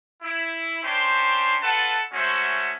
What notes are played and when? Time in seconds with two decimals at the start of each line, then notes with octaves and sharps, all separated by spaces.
0.23 E4
0.84 C#4 D4 C5 G5 C6
1.62 F4 A4 B4 F#5 A5
2.13 G#3 A3 C#4 F#4 C5 E5